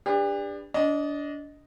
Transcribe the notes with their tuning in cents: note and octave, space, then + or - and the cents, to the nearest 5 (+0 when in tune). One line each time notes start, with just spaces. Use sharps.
D4 +0 G4 +40 B4 +0
D4 -25 D#5 +0